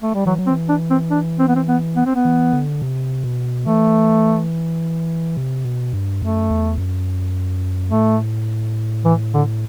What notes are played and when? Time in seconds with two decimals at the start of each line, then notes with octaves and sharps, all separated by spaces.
0.02 A3
0.14 G3
0.25 E3 F#3
0.38 F#3
0.47 C4
0.50 E3
0.69 D4
0.90 C4
1.10 D4
1.39 C4
1.48 B3
1.56 C4
1.68 B3
1.96 B3
2.06 C4
2.16 B3
2.25 E3
2.53 D3
2.82 C3
3.24 B2
3.66 E3 A3
5.37 C3
5.65 B2
5.93 G2
6.22 F#2 A3
6.51 E2
6.78 F#2
7.91 A2 A3
9.05 E3
9.34 D3